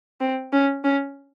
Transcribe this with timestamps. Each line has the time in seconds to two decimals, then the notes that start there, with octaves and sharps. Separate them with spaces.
0.21 C4
0.53 C#4
0.84 C#4